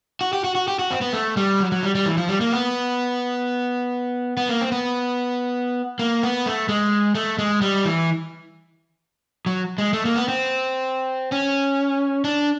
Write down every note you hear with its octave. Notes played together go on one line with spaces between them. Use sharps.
F#4
G4
F#4
F#4
G4
F#4
C4
B3
A3
G3
F#3
F#3
G3
G3
E3
F3
G3
A#3
B3
B3
A#3
C4
B3
A#3
B3
A3
G#3
A3
G#3
G3
E3
F#3
G#3
A3
A#3
B3
C4
C#4
D4